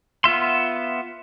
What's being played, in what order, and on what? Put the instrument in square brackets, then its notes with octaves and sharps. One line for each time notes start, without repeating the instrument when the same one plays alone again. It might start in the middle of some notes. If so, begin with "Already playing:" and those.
[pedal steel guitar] B3 F4 E5 C6